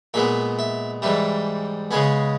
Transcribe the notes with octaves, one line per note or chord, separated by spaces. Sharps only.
A#2 G#3 B3 E5
E5
G#2 E3 G3 E5
C#3 G#3 B3 G#5